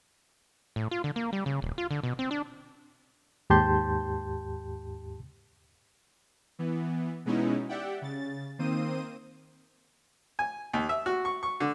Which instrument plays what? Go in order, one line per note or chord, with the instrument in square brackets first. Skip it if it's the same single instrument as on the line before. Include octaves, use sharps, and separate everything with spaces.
[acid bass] A2
F4
D3
A#3
G3
C#3
D#1
F4
D3
B2
C4
D4
[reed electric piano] D#2 G#2 G4 A5 C6 G6
[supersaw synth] E3 B3
B2 G#3 B3 C#4 D#4 E4
G4 D5 E5 F#5 G5
C#3 A6
D#3 A#3 C4 C5 D#6 D#7
[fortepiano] G#5
D#2
E5
F#4
C#6
C#6
D3